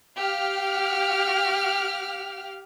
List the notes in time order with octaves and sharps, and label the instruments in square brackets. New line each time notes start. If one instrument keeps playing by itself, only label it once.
[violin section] G4 F5 F6